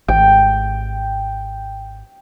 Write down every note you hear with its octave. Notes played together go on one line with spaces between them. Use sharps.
G#1 G5